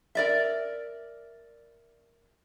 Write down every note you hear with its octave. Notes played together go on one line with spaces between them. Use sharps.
A#4 D5 E5